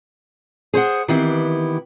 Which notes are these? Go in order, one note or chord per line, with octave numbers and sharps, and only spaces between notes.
G#4 C5 C#5 F#5
D#3 E3 B3 C4 E4 G4